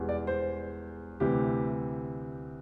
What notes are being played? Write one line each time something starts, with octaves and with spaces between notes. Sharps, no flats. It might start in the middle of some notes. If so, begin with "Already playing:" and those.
Already playing: E1 E2 E3 G3
D5
C5
D2 C3 E3 G3 G4